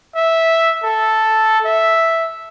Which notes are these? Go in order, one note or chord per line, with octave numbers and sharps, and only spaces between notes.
E5
A4
E5